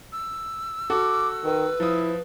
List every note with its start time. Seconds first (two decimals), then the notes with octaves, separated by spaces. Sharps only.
0.12 E6
0.90 F#4 A4 D6
1.44 D#3 B4
1.80 F3 E4 D#6